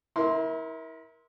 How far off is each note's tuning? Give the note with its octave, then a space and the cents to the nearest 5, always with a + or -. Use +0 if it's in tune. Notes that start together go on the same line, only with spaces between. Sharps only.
E4 -30 A#4 +25 C6 +0